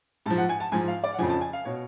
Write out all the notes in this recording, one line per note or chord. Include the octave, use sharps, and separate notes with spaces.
G#2 F3 A5
F#5
G#5
A5
G#2 F3 G#5
F5
D5
F#5
F2 C#3 F3 G#5
A5
G#5
F5
B2 C#5